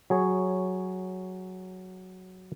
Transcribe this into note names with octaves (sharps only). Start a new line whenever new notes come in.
F#3 G#4 C#5